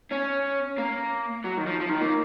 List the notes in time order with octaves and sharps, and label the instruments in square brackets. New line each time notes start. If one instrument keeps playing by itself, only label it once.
[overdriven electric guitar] C#4
A#3
F#3
D#3
F3
F3
D#3
A#3